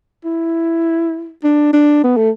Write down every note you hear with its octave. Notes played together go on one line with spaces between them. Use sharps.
E4
D4
D4
B3
A3